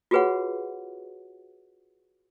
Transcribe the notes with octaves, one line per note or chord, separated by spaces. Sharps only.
F4 F#4 G#4 B4 C#5 F#5